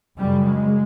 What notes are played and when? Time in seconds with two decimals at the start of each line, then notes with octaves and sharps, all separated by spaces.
0.18 F#2 C#3 G3
0.46 G#3